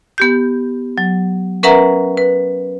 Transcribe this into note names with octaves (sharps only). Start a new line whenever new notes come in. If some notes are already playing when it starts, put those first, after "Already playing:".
B3 G4 G6
F#3
C#4 A#4 B4 E5 F#5 A#5
B4